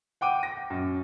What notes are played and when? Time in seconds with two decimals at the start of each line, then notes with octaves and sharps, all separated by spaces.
0.21 F#5 G5 D6 D#7
0.43 A#6
0.70 F#2